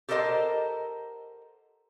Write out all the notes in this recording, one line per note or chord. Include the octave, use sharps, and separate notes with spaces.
G4 A4 A#4 C5 D#5 F#5